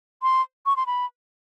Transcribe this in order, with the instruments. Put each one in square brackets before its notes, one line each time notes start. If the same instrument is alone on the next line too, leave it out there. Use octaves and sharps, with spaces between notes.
[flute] C6
C#6
C6
B5